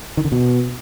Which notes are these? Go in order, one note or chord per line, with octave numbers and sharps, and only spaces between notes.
D#3
D3
B2